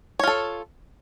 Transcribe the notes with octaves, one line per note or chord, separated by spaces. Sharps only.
F4 A4 C#5